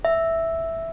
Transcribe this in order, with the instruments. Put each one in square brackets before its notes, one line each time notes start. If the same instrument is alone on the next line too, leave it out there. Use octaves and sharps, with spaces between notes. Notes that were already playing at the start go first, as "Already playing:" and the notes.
[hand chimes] E5